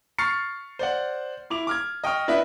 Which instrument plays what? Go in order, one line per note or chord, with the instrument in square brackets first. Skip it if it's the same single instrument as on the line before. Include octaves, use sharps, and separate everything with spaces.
[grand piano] C#6 F6 A6 C7 C#7
C5 D5 F#5
E4 D6 F7
D6 F6 G#6
D#5 G5 C#6 F6
B3 D4 E4 B4 D#5 E5